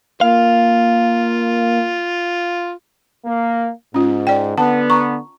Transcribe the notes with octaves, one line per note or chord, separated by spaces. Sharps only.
A#3 F4 F5
A#3
G#2 C#4 F4
D5 G5
D3 B3 F#5 A5
A#5 C#6